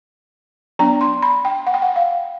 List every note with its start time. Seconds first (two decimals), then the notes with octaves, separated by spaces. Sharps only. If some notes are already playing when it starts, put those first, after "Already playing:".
0.79 F#3 B3 D4 A#5
1.01 C6
1.22 B5
1.45 G5
1.67 F#5
1.74 G5
1.82 F#5
1.96 F5